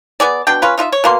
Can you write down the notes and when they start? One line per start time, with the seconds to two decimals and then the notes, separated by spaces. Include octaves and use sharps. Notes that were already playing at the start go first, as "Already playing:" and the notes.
0.20 B3 G#4 D5
0.47 B2 D4 G5
0.62 C#4 F4 B4
0.78 D#4 F4 A#4 E5
0.92 C#5
1.04 B2 A#3 C6